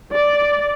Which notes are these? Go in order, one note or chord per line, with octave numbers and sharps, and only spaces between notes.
D5